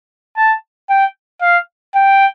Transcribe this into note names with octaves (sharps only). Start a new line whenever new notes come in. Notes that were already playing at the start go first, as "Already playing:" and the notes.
A5
G5
F5
G5